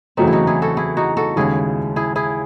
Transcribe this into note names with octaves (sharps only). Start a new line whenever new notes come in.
E2 C#3 F#3 A3 C4 D#4
E4
D#4 F#4
E4 G#4
F#4 A4
E4 G#4
D#4 F#4
F#4 A4
D#2 C#3 G#3 E4 G#4
E4 G#4
E4 G#4